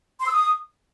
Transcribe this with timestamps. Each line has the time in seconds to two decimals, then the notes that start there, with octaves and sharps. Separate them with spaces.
0.20 C6
0.26 E6
0.33 D#6